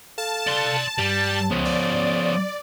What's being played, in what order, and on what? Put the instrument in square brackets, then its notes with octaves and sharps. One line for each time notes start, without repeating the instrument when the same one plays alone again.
[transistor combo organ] A4 F5 [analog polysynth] A5
[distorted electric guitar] D5 C6
[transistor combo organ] G2 [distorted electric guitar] G3
[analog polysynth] C#2 [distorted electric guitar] F3 B3 [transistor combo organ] C5 C#5 D#6
[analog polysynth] D5